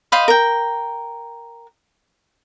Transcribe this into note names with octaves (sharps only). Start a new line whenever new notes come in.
C5 D#5 F5 B5
A#4 G5